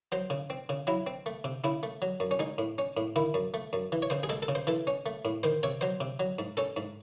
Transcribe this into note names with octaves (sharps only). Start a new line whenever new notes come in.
F#3 C5
C#3
C4
C#3
F#3 E4
C4
A3
C3
C#3 E4
A3
F#3
F#2
C#4
G#3 D#4
A2
C#4
A2
D#3 E4
F#2
A3
F#2
E3
C#5
C#3 C5
G#4
G#3 A4
A4
C#3
C5
E3 A4
C#4
A3
A2
D#3 C5
C3 C#5
F#3 C5
C3
F#3
G#2
C#4 A4
G#2